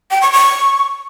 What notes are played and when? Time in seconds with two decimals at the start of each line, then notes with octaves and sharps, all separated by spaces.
0.11 G5
0.22 C#6
0.32 C#6